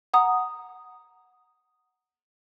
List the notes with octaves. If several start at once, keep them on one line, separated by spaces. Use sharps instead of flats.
F#5 A#5 D#6